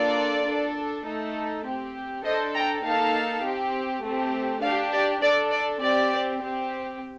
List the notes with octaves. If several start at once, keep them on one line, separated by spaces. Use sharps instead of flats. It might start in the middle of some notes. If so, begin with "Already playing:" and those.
Already playing: A#3 D4 F4 A4 D5
D4 A4
A3 D#4 A4
C4 G4
D4 A4 C5 D#5
G5 A#5
A#3 D#4 A4 F5 A5
C4 G4
A3 C4 G4
D4 G4 D5 F5
D5
D4 A4 D5
D5
C4 G4 D5
C4 G4